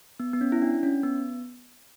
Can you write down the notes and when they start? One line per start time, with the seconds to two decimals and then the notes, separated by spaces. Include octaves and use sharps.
0.20 B3
0.33 B3
0.41 C#4
0.52 E4
0.62 D4
0.83 C#4
1.03 B3